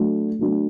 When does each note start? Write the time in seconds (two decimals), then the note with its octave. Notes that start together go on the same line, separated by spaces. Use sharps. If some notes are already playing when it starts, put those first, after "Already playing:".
Already playing: F#3 A3 D4 F#4
0.39 F#3 A3 D4 F#4